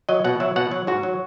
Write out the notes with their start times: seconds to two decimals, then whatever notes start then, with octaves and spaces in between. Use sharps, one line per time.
0.09 F#3 D#5
0.24 B2 F#5
0.40 F#3 E5
0.56 B2 F#5
0.71 F#3
0.87 G#2 F#4
1.03 F#3